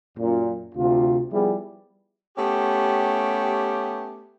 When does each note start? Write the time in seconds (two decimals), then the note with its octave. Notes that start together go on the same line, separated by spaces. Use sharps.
0.18 F#2 A#2
0.75 D2 C3 F4
1.31 F3 G3 B3 E4 G#4
2.37 A3 B3 C#4 G4